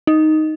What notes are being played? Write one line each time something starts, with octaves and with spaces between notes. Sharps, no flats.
D#4